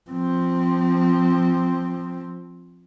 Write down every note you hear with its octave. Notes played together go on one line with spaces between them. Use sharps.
F3 C4